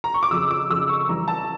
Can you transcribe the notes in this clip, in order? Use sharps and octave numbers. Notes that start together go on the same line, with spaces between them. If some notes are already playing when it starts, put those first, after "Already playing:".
A#5
C#6
D6
F2 C#3 F3 E6
D6
F2 C#3 F3 E6
C#6
F2 E3 G3 A#5
A5